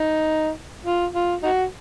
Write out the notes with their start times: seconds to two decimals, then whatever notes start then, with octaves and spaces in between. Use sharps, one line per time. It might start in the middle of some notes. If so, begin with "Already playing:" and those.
Already playing: D#4
0.85 F4
1.14 F4
1.43 D#4 F#4